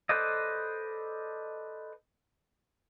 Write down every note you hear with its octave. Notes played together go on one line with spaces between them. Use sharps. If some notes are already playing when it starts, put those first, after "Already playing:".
A4 B4 C5 D5 D#5